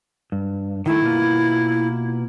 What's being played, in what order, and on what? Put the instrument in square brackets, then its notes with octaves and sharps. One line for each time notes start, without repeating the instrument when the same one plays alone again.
[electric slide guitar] G2
[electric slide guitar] D#3 A3 [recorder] E4
[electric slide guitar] B2 A#3 F4